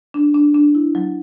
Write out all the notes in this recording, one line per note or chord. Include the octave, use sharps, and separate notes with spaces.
D4
D4
D4
E4
F#3